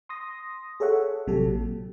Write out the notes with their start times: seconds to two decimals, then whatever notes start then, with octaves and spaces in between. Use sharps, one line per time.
0.09 C6 D#6 A#6
0.80 G#4 A4 C#5 E5 F#5
1.27 A1 C3 F#3 G4 A4
1.49 A#2